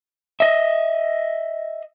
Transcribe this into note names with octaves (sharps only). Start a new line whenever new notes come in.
D#5 E5